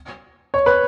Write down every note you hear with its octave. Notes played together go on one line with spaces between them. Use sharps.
C#5
B4